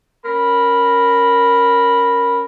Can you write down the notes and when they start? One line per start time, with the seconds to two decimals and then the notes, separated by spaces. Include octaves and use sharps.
0.25 C#4 A#4 B5